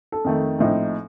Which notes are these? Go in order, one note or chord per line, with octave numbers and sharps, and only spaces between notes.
A4
F2 D#3 A3
A#1 A2 F3 C4 D#4